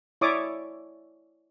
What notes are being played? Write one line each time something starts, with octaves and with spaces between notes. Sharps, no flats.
E4 C#5 D5 E5 D6 D#6